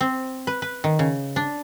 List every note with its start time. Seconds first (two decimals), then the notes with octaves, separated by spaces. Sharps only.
0.01 C4
0.47 B4
0.62 B4
0.84 D#3
0.99 C#3
1.36 D4